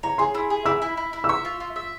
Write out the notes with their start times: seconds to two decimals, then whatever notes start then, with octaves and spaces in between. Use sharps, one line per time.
0.03 C#5 A#5
0.18 G#4 C6
0.35 E4
0.50 G#4
0.66 E4 E6
0.82 E4
0.97 E4
1.13 E4
1.24 E6
1.29 E5 C#6
1.45 F4
1.60 F4
1.76 E5